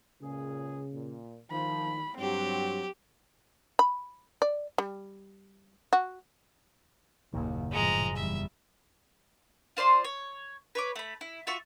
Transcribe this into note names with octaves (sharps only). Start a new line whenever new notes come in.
C#2 A#2 C#3 G#4
A#2
D#3 F3 B5
G2 F#3 C4 G4
B5
D5
G3
F#4
F#1 D#2 A#2 D#3
A2 F3 G#3 A#5
E2 G3 E5
F4 C5 D5 C6
C#5
B4 C#5 D6
A3 B5
E4
F4 F#4 E5 C#6